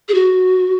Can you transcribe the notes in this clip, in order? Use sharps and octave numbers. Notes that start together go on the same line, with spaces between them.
G#4
F#4